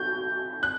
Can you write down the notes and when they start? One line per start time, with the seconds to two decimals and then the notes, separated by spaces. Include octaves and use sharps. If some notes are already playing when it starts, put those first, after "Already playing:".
Already playing: F#4 G6
0.63 F#6